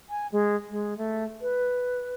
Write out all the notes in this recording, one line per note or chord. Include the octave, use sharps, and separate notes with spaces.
G#5
G#3
G#3
A3
B4